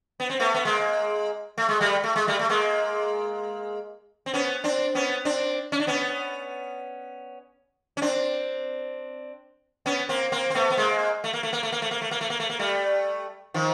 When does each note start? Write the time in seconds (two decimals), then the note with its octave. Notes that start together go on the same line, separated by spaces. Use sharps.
0.20 B3
0.30 C4
0.40 A3 B3
0.55 B3
0.65 G#3 A#3
1.58 A3
1.69 G#3
1.81 G3 A3
2.04 A3
2.16 G#3
2.27 G3 A3
2.39 A3
2.49 G#3 A#3
4.26 C4
4.34 B3 C#4
4.64 C4 D4
4.95 B3 C#4
5.25 C4 D4
5.72 C#4
5.80 D4
5.87 B3 C#4
7.97 C#4
8.02 C4 D4
9.86 B3 C#4
10.09 A#3 C4
10.32 A#3 C4
10.50 C4
10.55 A3 B3
10.71 B3
10.77 G#3 A#3
11.24 A3
11.33 A#3
11.43 A3
11.53 A#3
11.63 A3
11.72 A#3
11.82 A3
11.91 A#3
12.02 A3
12.11 A#3
12.21 A3
12.30 A#3
12.40 A3
12.50 A#3
12.59 G3 A3
13.54 D#3 F3